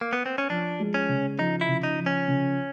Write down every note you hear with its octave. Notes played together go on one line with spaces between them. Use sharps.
A#3
B3
C4
C#4
F3 D4
G#3
C#4
C#3
F3 D#4
E4
C#3
D#4
F3
C#4
C#3